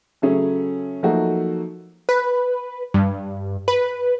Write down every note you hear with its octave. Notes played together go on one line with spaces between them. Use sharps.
C#3 F#3 A3 C#4 G#4
F3 F#3 A3 A#3 D#4 F#4
B4
G2
B4